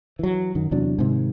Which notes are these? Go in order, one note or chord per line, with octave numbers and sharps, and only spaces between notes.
E3 F#3
F#2 D#3
E2 C3 F#3 D4
G#2 C3 D#3